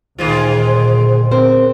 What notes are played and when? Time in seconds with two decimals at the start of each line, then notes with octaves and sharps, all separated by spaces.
0.18 D2 A#2 D#3 G#3 F4 C5
1.31 C4 A#4 C5